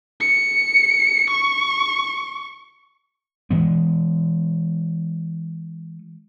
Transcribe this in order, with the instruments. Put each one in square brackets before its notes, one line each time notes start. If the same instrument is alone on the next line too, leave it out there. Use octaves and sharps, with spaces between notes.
[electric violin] C#7
C#6
[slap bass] E3 G#3 B3